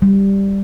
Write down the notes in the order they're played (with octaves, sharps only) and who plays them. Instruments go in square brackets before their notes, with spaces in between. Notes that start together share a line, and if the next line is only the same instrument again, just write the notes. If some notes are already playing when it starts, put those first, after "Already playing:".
[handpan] G3